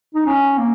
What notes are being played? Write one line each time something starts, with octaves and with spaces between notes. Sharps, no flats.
D#4
C#4
A#3